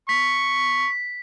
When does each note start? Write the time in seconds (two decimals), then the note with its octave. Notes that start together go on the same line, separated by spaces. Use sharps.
0.09 C#6 B6